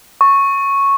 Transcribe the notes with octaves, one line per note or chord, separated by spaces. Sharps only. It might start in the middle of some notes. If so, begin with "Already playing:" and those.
C#6